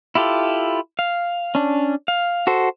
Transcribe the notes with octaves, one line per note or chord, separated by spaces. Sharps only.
E4 F4 G4 A4
F5
C#4 D4
F5
F#4 A4 C5